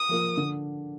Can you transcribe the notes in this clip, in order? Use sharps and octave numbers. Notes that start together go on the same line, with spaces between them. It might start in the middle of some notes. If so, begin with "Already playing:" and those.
Already playing: D#6
F3 A#3 F4
D3